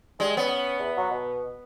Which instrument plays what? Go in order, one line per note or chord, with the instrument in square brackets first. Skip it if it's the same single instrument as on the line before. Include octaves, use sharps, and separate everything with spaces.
[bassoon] G3 [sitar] G#3
[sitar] B3 [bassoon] C#4
[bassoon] E2
F#3
B2